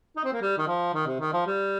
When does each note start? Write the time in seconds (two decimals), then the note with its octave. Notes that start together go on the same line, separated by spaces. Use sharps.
0.17 D#4
0.25 C4
0.33 A#3
0.42 G3
0.58 D#3
0.67 F3
0.94 D#3
1.07 C3
1.20 D#3
1.33 F3
1.46 G3